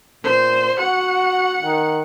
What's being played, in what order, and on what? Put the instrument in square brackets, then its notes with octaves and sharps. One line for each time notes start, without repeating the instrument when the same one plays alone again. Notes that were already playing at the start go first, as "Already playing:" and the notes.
[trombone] A#2 [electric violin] C5
[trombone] F#4 [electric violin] F#5
[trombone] D#3